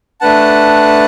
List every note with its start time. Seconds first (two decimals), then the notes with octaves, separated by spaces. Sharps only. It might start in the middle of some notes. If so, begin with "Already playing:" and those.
0.21 A3 D4 B4 F#5 A5